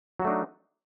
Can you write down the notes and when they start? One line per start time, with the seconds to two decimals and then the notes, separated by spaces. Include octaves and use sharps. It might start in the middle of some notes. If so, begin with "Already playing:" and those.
0.20 F#3
0.22 F#4
0.25 A3
0.27 D4
0.30 D#4